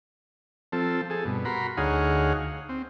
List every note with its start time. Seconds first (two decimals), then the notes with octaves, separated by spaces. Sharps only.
0.72 F3 C4 A4
1.10 G#4 A4
1.25 G2 B2
1.45 F#4 A#4 B5 C6
1.77 D2 D#4 G#4 C#5 F5 F#5
2.69 C4